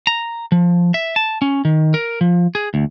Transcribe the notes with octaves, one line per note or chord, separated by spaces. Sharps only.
A#5
F3
E5
A5
C#4
D#3
A#4
F3
G#4
D2